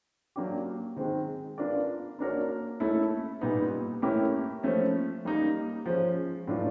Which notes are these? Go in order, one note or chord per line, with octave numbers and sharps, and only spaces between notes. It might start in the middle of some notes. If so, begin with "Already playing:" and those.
F#3 A#3 D4 G4
D#3 G#3 C4
B3 D4 F4 A#4 D5
A#3 D4 F#4 A#4 C#5
A3 C#4 E4 A4
A#2 G3 B3 D#4
A3 C#4 E4 G4 A#4
F3 A3 C#4
G3 A#3 D#4
F3 G#3 C#4
A2 F#3 B3 D4 F4